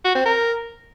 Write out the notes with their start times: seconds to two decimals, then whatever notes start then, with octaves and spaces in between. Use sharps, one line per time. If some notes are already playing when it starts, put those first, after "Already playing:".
0.05 F#4
0.15 C4
0.25 A#4